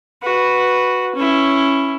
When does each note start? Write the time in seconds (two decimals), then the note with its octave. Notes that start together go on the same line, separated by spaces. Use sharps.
0.23 F#4 B4
1.15 C#4 E4